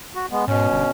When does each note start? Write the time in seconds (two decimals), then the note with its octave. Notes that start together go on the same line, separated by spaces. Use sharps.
0.16 F#4
0.31 G#3 B3
0.48 G#2 B2 C#4
0.72 G1